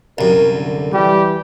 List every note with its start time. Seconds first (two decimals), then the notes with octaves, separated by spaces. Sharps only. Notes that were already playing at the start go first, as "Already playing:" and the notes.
0.18 C2 F#2 A#4
0.53 D3
0.93 E3 G3 G4